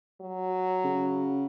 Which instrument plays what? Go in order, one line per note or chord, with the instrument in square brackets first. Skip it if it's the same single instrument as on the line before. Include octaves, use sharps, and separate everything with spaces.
[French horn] F#3
[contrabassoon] C#3